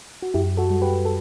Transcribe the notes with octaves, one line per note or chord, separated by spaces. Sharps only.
F#4
F#2 E4 G4
F#4 A4
G3
G4 B4
A4